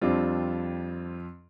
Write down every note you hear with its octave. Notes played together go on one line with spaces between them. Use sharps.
F2 G3 C4 D4 F4